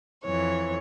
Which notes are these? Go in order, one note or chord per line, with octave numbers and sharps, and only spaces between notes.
F2 E3 C#5